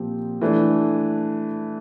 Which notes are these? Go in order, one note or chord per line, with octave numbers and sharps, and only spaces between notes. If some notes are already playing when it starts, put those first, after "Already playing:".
Already playing: A#2 F3 C4 G4
E3 A3 D4